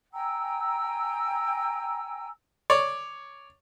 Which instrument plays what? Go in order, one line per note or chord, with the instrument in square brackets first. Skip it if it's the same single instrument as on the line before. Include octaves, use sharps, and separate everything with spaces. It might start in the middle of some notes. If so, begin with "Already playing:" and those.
[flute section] G5 G#5 A#5 E6
[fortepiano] C#5 D5